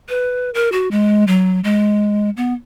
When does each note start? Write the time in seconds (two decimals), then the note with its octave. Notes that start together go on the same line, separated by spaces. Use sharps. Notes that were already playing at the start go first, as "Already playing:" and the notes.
0.09 B4
0.54 A#4
0.72 F#4
0.91 G#3
1.27 F#3
1.64 G#3
2.37 B3